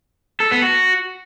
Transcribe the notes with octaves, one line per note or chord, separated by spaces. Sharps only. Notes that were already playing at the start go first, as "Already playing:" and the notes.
A4
B3
F#4